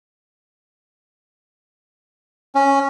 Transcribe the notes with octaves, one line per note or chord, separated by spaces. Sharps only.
C#4